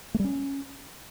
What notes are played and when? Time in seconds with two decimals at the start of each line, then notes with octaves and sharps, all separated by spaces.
0.14 A3
0.19 G3
0.25 C#4